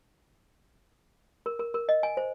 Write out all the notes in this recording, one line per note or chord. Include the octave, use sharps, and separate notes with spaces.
A#4
A#4
A#4
D#5
G#5
C5